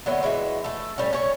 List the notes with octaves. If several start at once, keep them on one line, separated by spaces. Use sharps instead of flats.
D3 F#3 A3 B3
E3 G#3 F#4 E5
A3 A4
A2 G3 C#4
C#4 C#5